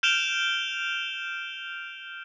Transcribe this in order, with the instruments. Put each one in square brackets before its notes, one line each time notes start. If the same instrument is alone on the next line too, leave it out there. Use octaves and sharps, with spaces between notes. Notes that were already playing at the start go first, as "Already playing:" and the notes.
[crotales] F6 G6 D7 E7 F7 G7